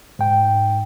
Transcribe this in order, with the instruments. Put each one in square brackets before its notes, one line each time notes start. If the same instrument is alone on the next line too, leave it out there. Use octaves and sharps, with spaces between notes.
[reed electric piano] G#2 G5